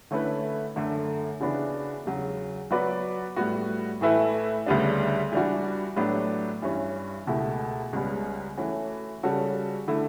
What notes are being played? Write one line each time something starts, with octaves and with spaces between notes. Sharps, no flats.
D3 A3 C#4 E4 B4
F#2 D3 A3
C#3 E3 B3 D4 F#4
E2 C#3 F#3
F#3 B3 F#4 B4 D5
A2 G3 B3 F#4
A2 E3 A3 E4 B4
D2 C#3 G3 B3 D4
E3 G3 D4 F#4
A2 F#3 B3 D4 G4
G2 E3 G3 C#4
C#2 B2 A3 E4 G4
C#2 C#3 G3 B3
E3 A3 C#4 F#4
C#3 G3 C#4 F#4 A4
D3 A3 E4